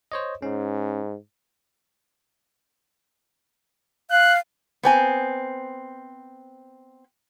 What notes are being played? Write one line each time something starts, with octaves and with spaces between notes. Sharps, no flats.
C5 C#5 D#5
G#2 C#4
F5 F#6
B3 C4 G#5